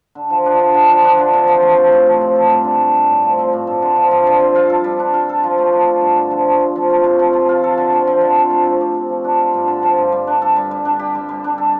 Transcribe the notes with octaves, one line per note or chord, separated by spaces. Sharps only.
D3
F3
D4
D3
D3
F3
D4
D3
C3
F3
A3
C3
A2
F3
C4
A4
G2
D3
A3
G2
A2
F3
C4
A2
G2
D3
F3
G2
F3
C4
F4
A4
G3
D4
F4
A4
F3
A3
D4
A4
G2
D3
F3
A3
C3
F3
A3
C3
F3
A3
F4
A4
D3
F3
C4
D3
F3
A3
C4
G4
C3
F3
D4
F4
G2
D3
F3
G2
G3
D4
A4
G3
G3
D4
G4
G3
G3
D4
A4